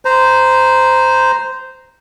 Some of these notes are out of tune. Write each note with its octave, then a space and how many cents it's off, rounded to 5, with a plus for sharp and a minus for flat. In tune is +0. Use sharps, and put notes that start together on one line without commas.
C5 -10 A#5 +0